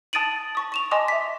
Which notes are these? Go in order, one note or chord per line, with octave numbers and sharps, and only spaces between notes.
A5 D#6 A6 D7 D#7 F#7
A5 C#6 D#6
C#6 E7 F7
D#5 G#5 A5 C6 D6 D#6
E5 B6